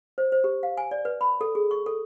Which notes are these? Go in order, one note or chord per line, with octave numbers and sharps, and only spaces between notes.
C5
C5
G4
F5
G#5
D5
B4
B5
A4
G#4
C#6
A4